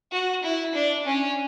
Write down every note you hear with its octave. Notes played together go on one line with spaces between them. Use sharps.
F#4
E4
D4
C#4